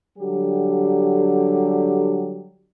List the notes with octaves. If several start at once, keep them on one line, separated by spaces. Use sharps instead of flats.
D3 F#3 G3 G4